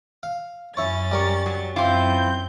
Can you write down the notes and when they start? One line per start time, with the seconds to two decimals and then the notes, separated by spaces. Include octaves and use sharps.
0.23 F5
0.77 F#2 C#4 E4 C#5 A6
1.11 G3 A#4 C#6
1.46 F#3
1.76 F#2 E3 C4 E4 F4 C6 D6 G6